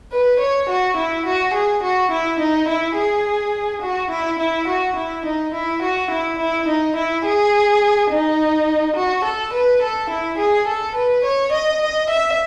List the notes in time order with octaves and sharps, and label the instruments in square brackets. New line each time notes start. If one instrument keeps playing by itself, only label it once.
[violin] B4
C#5
F#4
E4
F#4
G#4
F#4
E4
D#4
E4
G#4
F#4
E4
E4
F#4
E4
D#4
E4
F#4
E4
E4
D#4
E4
G#4
D#4
F#4
A4
B4
A4
E4
G#4
A4
B4
C#5
D#5
D#5
E5